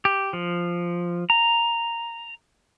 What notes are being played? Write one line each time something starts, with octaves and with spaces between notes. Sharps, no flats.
G4
F3
A#5